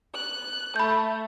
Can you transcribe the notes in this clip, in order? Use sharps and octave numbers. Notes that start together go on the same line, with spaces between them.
F#6
A3 B5 G6